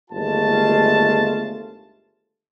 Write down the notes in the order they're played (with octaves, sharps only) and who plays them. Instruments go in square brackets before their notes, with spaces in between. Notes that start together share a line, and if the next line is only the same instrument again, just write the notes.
[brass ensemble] G1 D#2 G#3 A3 F4 A5